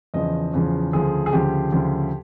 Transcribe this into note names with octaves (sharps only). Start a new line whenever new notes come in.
E2 C#3 F3 D#5
E2 C#3 F3
D2 C#3 F3 G#4
G#4
D2 C#3 F3 G4
D2 C#3 F3